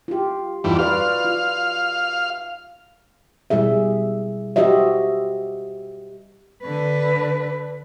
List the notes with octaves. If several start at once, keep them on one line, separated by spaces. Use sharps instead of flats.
F4 G4
E2 G2 D#4 F4 F#4
F4 B4 D5 F5
F4
B2 G3 E4 G#4 E5
F#4 G4 C5 D#5 E5
D3 B4